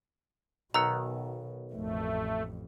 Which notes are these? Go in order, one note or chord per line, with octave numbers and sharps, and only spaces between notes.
B1 B2 D#3 F#5 A#5 E6
A1 F2 A3